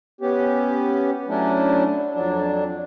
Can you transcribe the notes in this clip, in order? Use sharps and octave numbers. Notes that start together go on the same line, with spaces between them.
B3 C#4 G4
F#3 A3 C#4 D4 E4
F2 F#3 D4